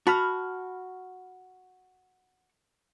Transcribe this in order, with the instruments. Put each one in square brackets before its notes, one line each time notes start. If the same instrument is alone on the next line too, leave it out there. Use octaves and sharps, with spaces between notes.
[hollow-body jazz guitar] F#4 [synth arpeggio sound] A5 B5 F6